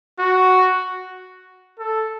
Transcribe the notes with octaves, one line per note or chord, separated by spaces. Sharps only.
F#4
A4